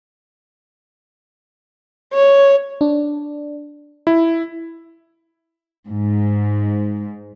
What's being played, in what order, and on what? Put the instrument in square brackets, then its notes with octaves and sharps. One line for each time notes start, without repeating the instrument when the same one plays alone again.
[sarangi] C#5
[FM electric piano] D4
[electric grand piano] E4
[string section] G#2